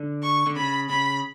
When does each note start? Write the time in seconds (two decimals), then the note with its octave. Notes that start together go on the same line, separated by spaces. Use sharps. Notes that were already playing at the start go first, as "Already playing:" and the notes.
Already playing: D3
0.23 C#6
0.47 D3
0.56 C#3 B5
0.89 C#3 B5